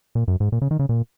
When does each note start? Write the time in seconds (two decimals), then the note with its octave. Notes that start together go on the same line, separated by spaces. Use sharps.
0.15 A#2
0.28 F#2
0.40 G#2
0.52 A#2
0.62 C#3
0.71 D#3
0.79 C#3
0.89 A#2